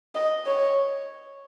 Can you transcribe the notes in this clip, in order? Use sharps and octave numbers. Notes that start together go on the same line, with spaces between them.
D#5
C#5